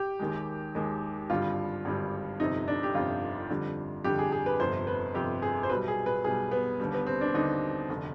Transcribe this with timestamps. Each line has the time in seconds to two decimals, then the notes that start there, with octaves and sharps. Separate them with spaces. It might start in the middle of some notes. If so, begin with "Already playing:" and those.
Already playing: G4
0.20 D#2 D#3 G#3
0.75 D#2 D#3 G#3
1.30 G#1 G2 D3 G3 F4
1.85 G#1 G2 D3 G3
2.40 G1 F2 C3 D#4
2.68 D4
2.83 G4
2.94 G1 F2 C3 F4
3.50 F2 D3 G3
4.04 F2 D3 G3 G4
4.19 G#4
4.32 G#4
4.46 B4
4.60 G1 F2 C3 C5
4.87 B4
5.14 G1 F2 C3 G4
5.42 G#4
5.63 C5
5.70 B1 B2 G3 B4
5.88 G#4
6.06 B4
6.24 B1 B2 G3 G#4
6.51 B3
6.80 D#2 D3 G3
6.93 B3
7.06 C4
7.21 D4
7.34 D#2 D3 G3 D#4
7.89 F1 D3